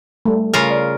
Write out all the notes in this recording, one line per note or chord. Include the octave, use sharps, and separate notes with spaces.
G3 A3
C#3 F4 A#4
D5